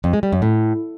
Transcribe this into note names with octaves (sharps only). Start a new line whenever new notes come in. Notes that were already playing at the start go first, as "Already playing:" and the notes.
F2
G#3
G3
F#2
A2